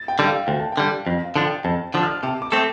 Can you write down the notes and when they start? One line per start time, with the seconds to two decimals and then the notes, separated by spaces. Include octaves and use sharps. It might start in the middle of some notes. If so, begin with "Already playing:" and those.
Already playing: A6
0.08 G5
0.19 D3 G3
0.28 F5
0.47 D2 G5
0.60 A5
0.72 G5
0.77 D3 G3
1.06 F2 F5
1.25 F5
1.36 D3 F3 D4
1.46 G5
1.64 F2 A5
1.94 D3 F3 D4
2.03 F6
2.23 C3 A5
2.42 D6
2.52 A3 C4 A4